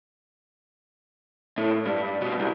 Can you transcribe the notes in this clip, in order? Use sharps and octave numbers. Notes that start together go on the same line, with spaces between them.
A2
G2
B2
C2